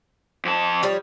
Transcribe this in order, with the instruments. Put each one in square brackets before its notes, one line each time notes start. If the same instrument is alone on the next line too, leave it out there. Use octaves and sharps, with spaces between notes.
[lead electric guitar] F2 A5
[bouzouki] F3 G3 C#5